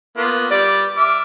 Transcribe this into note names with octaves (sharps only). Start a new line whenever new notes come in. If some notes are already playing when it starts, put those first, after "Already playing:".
A#3 B3 F4
G3 D5
E5 D6 F6